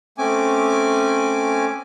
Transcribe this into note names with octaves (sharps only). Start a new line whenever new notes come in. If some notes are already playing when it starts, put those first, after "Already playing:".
A3 C4 C#4 G#5 D6